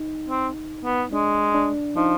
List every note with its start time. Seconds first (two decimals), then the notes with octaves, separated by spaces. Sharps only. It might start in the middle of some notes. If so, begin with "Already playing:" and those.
Already playing: D#4
0.29 C4
0.84 B3
1.13 G#3 D4
1.54 D4
1.96 F3 D#4